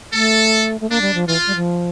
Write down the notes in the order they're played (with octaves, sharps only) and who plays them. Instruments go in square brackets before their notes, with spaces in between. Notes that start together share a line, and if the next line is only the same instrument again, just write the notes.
[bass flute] A3 [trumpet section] A4
[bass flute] A3
[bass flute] A#3 [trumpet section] D4
[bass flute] G3
F3
[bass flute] E3 [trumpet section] F4
[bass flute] G3
F3